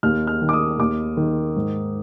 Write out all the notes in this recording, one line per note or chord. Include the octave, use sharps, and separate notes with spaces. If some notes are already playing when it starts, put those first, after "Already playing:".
D#2 F6
F6
D#3
D6
D#6
D#2 D6
D#3
G#2